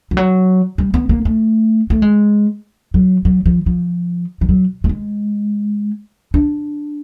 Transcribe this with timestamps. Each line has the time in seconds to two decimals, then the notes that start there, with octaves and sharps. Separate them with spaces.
0.11 F3
0.17 F#3
0.78 G3
0.94 B3
1.09 A#3
1.25 A3
1.90 A3
2.02 G#3
2.94 F#3
3.25 F#3
3.46 F3
3.66 F3
4.41 F3
4.49 F#3
4.84 A3
4.89 G#3
6.34 D4